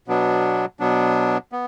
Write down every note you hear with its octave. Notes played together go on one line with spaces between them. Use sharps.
B2 F#3 B3 D4
B2 F#3 B3 D4
B3